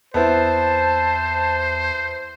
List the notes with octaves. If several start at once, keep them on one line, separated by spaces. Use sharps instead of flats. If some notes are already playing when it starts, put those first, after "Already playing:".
E2 B3 C4 E4 C5 A5